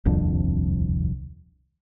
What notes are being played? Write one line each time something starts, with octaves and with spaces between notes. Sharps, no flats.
D#1 C2 F2 D4